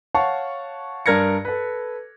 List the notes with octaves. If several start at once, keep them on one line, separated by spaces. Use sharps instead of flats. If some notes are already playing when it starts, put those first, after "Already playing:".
C#5 F5 F#5 A5 C#6
G2 D4 A#4 G#6 A#6 C#7
A4 B4